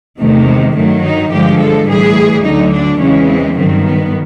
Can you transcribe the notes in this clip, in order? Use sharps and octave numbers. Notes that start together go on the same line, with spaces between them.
E2 C3 D#3 A3
G#3
G2 D#3 F#3 A3
D#4
G2 D3 F3 G#3 G4
A4
A2 E3 G3 G#4
D2 D3 F#3 D#4
D4
E2 C#3 E3 G#3 C#4
C4
G2 D#3 F#3 C4
B3